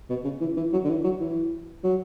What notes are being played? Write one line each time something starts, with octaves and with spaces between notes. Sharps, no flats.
B2
C#3
E3
E3
F#3
D3
E3
F#3
E3
F#3